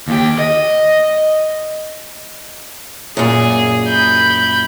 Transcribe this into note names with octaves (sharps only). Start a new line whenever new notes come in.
D#2 G4
D#5
F#2 A#2 G#4
B5 G6